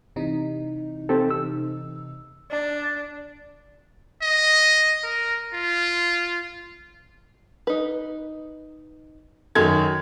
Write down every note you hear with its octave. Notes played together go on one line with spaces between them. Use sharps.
C3 E3 D#4
C4 G4 A4
E6
D4
D#5
A#4
F4
D#4 B4
F#2 D#3 A4 G#6